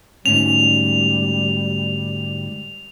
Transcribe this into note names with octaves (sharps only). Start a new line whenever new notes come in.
D2 G#2 G3 C#4 F7